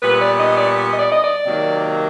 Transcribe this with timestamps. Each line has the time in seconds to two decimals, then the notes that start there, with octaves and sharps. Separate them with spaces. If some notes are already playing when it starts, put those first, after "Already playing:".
0.02 A#2 G3 B3 B4
0.20 D5
0.38 D#5
0.57 D5
0.92 D#5
0.99 D5
1.11 D#5
1.23 D5
1.46 C3 D#3 F#3 A#3